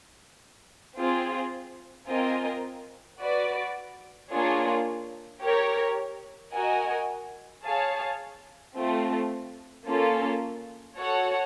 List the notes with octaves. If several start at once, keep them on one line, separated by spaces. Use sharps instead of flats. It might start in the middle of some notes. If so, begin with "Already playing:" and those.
C4 F4 G#4
C4 F4 A#4 D#5 G#5
F#4 B4 D5
A#3 D4 F4 G#4 C#5
G4 A#4 C#5
F#4 A#4 D#5 G#5
G#4 C#5 F5 A5
A3 C4 F4
A#3 C#4 F4 A4
F#4 A4 C#5 F#5